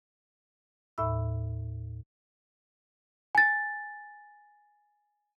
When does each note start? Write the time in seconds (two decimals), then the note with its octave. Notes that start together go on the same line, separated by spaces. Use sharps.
0.98 D#2 A2 E5 B5 E6
3.35 G#5 A6